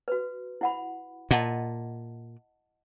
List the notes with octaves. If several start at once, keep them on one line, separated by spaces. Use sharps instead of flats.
F#4 B4
E4 F#5 B5
A#2 D#5 F#5 A5